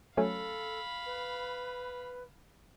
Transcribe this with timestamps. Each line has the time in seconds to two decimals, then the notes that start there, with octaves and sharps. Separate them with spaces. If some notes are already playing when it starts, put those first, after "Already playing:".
0.17 F#3 A3 C#4 A4 F5 B5
1.06 B4